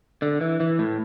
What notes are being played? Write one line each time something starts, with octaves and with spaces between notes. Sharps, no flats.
D3
E3
E3
A2